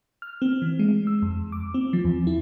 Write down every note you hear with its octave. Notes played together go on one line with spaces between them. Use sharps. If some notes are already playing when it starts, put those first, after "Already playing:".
F6
C4
E3
G#3
E6
F2
D6
C4
F3
E2
E4